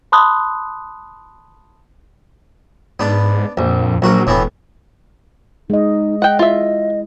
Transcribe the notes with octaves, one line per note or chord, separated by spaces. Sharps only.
A5 B5 C6 D#6 F#6
G#2 B3 D4
A#1 F2
A#1 F#3 F#4 A#4
E1 A2 E3 B3
G#3 D#4 D#5
D#5 F#5 G5
E4 F4 E5